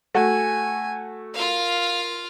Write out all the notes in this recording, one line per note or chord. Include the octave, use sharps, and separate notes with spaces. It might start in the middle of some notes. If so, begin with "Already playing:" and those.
A3 F#4 G#5
F4 A#4 F5